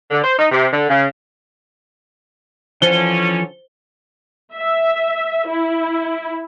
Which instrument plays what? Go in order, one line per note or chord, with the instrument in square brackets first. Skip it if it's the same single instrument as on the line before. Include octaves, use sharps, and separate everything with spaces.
[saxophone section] D3
C5
D#4
C3
D3
C#3
[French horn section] D3 C#4 [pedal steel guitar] E3 F3 A4 [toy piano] C5 [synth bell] G7
[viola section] E5
E4